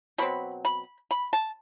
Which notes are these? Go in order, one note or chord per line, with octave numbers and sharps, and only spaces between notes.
B2 F#3 C4 B5
B5
B5
A5